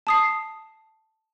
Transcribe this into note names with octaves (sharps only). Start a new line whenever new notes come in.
A5 D#6 C7